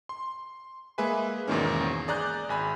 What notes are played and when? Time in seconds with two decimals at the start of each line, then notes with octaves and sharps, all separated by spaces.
0.09 C6
0.98 G#3 A#3 G#4 B4 E5 G#5
1.48 E2 G#2 B2 D#3 A#3 C#4
2.08 G#4 D5 A#5 F#6 G6
2.49 G#1 G#5 B5